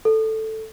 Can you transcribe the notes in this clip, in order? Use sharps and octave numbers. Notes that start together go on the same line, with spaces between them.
A4